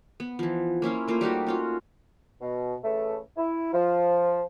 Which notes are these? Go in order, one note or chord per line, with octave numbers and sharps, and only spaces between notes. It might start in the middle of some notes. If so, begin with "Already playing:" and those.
B3
E3 F3
A#3 C#4 E4 F4
A3 A#3 F4 C5
G3 D#4 F#4 G4
C#4 F4 F#4
B2
C#3 E3 A3
E4
F3